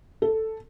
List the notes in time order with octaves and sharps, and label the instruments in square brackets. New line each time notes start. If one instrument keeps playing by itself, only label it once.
[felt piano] A4